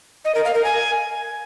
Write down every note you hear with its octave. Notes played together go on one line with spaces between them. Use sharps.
D#5
A#4
F5
A#4
G#5